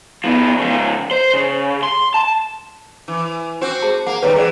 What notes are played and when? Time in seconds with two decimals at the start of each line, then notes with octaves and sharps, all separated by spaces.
0.24 F3 B3
0.58 C#3 F3
1.11 C5
1.34 C#3
1.83 C6
2.14 A5
3.08 E3
3.61 C4 F#4 C5
3.82 G#4 A5
4.06 A#3 F#5
4.22 D#2 C3 G3 B4 C#5 G5
4.36 E3 G#4 D5 F#5